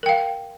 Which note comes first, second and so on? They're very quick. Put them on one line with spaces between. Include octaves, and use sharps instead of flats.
A#4 G5 F5